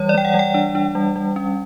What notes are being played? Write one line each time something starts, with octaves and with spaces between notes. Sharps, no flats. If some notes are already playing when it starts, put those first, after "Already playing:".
Already playing: E3 G3 C#5
D5
G3 G5
F#5
G3
G5
D4
D4
G3
G3
C#4